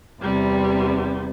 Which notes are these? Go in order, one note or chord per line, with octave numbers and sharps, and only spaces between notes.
E2 C3 G3